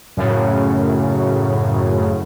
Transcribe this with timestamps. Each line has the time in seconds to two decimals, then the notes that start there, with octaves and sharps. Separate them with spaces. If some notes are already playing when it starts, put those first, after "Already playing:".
0.17 F#2 A2 C#3